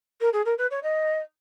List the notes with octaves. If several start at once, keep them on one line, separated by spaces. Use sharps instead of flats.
A#4
G#4
A#4
B4
C#5
D#5